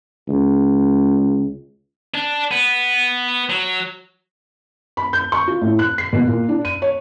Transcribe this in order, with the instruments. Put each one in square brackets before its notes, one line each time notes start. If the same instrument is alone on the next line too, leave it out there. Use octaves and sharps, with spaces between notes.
[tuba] C#2
[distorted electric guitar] D4
B3
F#3
[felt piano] B5
G6
C#6
F4
A2
F#6
C7
B2
A#2
D4
D#7
C#5